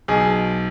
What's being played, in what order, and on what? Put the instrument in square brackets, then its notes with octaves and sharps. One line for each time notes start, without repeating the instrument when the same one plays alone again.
[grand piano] B1 G#4